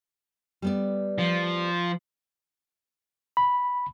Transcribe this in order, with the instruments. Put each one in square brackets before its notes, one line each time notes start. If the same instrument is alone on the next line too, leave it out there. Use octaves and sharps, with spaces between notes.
[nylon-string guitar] G3 B3 D5
[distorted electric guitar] F3
[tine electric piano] B5